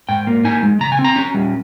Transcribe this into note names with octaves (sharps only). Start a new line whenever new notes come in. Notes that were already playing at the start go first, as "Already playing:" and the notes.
G#2 G5
A#3
D#4 G#5
G#3
C#3 A#5
G#5
C4
A#5
C#4
G3